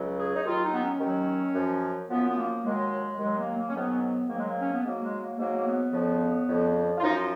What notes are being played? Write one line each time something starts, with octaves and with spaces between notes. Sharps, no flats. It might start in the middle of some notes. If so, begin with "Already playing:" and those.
Already playing: C#2 C#3 F#3
G#4
D#4
D#2 D#3 F#3 F4
D#4
B3
C#4
D#2 D#3 F#3
F#2 F3
F#2 F3 B3
B3
A#3
D#2 D#3 F#3 G#3
D#2 D#3 F#3 G#3
A#3
A#3
C#4
G#2 D#3 F#3 B3
C#4
B3
G#2 D#3 F#3 A#3
G#3
A#3
C#4
B3
G#2 F#3 A#3
G#3
A#3
G#2 F#3 A#3
A#3
B3
F2 C#3 F3
F2 C#3 F3
F4
F#2 F3 D#4
F4